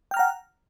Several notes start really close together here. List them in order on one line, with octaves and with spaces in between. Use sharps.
G5 F6 A#5 F#5